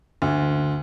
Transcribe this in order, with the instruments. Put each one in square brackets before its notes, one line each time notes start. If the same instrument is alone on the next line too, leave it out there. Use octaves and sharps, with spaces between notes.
[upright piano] D2